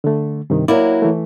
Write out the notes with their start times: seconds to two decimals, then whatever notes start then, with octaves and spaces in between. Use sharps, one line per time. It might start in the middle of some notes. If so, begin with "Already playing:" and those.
0.04 D3 A3
0.50 G2 C3 D#3
0.68 F#3 A#3 E4 D5
1.02 E3 A3